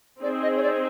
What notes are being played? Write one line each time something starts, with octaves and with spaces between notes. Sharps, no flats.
C4 D#4 G#4 D5
D#5
C#5
D5